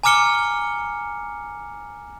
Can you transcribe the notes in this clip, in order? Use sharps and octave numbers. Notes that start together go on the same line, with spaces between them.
G#5 A#5 D6 F6 C#7 G7